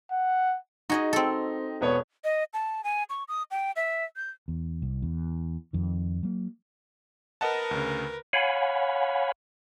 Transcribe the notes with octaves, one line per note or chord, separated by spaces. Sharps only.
F#5
D#4 F#4 G#4 D#5
C4 A4
E1 B3 C#5
D#5
A5
G#5
C#6
D#6
G5
E5
G6
E2
C2
E2
F2 D#3
F#3 A#3
A#4 B4 D#5 F#5 A5
D2 C#3
C#5 F5 F#5 G#5 B5